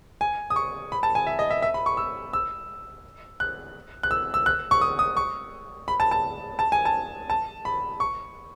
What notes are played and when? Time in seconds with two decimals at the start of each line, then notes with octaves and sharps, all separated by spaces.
0.21 G#5
0.50 D#6
0.56 C#6
0.92 B5
1.03 A5
1.15 G#5
1.27 E5
1.39 D#5
1.51 E5
1.62 E5
1.74 B5
1.86 C#6
1.97 E6
2.33 E6
3.40 F#6
4.03 F#6
4.11 E6
4.34 E6
4.46 F#6
4.71 C#6
4.81 D#6
4.99 D#6
5.17 C#6
5.88 B5
6.00 A5
6.11 A5
6.59 A5
6.72 G#5
6.85 A5
7.30 A5
7.65 B5
8.00 C#6